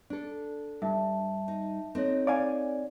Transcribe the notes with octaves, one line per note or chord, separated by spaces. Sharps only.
D4 A4
G2 E5 A5
D#4
C4 D#4 A4 C#5
D5 F5 G#5